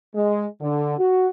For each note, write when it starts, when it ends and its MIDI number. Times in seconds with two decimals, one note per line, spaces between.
0.15 0.45 56
0.61 0.98 50
0.99 1.29 66